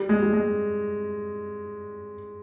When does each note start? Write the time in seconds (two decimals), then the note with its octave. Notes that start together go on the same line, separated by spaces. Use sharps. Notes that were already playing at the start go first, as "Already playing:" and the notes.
Already playing: G3
0.09 G#3
0.22 G3
0.33 G#3